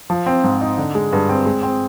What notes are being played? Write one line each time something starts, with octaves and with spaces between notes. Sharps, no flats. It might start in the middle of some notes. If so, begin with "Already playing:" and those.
F3
C4
G#2
D#4
D3
G#3
G2
C4
G#3
C4